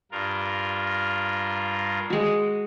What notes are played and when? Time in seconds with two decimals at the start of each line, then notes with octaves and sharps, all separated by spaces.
0.11 G2 F4 A#4
2.10 G#3 F#4